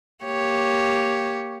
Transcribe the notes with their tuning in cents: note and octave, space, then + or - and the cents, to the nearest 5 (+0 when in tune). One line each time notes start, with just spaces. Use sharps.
A#3 +0 G4 +0 C#5 +0